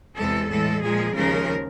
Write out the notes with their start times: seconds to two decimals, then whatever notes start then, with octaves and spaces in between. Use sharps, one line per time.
0.16 E2 C3 E3 G#3 A4
0.49 A2 E3 G#3 A4
0.82 A#2 F3 G#3 G#4
1.14 D#2 C#3 F3 G#3 A#4